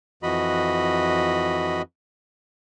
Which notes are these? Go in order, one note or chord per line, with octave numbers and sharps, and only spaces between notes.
F2 E3 F#4 D#5 B5